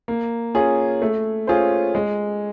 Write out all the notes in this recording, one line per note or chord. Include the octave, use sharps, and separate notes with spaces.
A#3
C#4 F4 G#4
A3
C#4 F4 G#4 C5
G#3